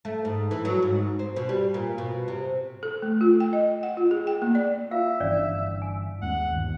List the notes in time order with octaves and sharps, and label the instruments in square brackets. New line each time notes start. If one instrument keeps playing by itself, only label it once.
[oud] A3
G#2
E3
F#3
G#2
C4
B2
G3
A#2
B2
C3
[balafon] A4
A3
F4
G5
D#5
F#5
F4
G#4
G5
A#3
D5
[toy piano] F4 F5 [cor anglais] E5
[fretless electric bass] G1 E3 D4 [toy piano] C#4 D5
[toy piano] G#5
[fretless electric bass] D#2 G#3 C#4 [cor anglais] F#5
[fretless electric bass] G1 D#2